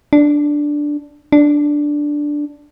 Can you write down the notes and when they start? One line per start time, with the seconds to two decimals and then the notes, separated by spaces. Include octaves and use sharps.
0.13 D4
1.32 D4